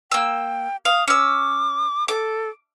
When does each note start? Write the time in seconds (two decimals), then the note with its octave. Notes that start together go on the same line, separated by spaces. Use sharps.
0.12 A#3 G5 E6
0.85 F5 D#6
1.08 C#4 D6 E6
2.08 A4 D6